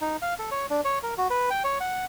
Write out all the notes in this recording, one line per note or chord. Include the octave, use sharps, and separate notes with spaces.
D#4
F5
A4
C#5
D4
C#5
A#4
F#4
B4
G5
C#5
F#5